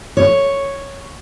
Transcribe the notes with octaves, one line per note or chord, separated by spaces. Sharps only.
C#5